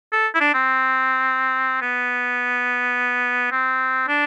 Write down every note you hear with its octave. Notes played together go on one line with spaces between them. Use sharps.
A4
E4
D4
C4
B3
C4
D4